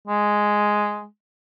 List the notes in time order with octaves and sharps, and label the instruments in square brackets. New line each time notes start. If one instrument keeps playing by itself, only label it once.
[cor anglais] G#3